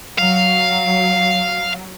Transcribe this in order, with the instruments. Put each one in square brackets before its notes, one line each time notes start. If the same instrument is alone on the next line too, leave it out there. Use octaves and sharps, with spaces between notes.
[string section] F#3 [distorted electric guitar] F5